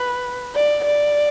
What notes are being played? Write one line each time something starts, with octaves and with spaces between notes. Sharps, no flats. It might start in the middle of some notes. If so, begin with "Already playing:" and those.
Already playing: B4
D5
D5